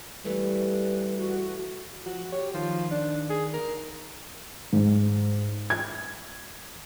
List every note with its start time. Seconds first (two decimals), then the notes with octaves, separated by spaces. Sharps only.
0.25 E3 G3 A3 B4
1.17 F#4
2.06 F3 F#4
2.32 G4 C#5
2.54 D#3 F3
2.91 D4
3.30 G#4
3.54 A#4
4.73 G#2
5.70 G#6